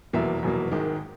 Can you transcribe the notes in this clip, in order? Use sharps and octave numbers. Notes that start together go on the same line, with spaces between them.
F1 E2 B2 F#3 A#3 E5
F1 E2 B2 F#3 A#3
G#1 G#2 D#3 G#3